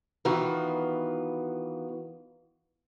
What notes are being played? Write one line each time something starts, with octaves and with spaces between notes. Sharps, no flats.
D#3 E3 B3 F4 F#4